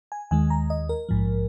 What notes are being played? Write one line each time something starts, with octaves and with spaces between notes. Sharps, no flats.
G#5
D#2 D#3 G#3 G#5
A#5
D#5
A#4
A#1 G#2 F3